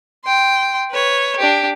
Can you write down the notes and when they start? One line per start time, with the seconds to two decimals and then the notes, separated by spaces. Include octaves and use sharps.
0.24 G5 C6
0.90 B4 C#5
1.38 D4 G4